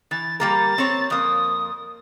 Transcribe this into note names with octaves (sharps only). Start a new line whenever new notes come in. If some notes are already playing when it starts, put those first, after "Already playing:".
E3 A6
G3 A#3 A#4 A6
C4 C#5
F2 A#3 D#6